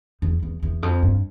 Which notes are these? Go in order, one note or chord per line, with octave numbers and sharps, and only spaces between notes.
E2
E2
E2
F2
G2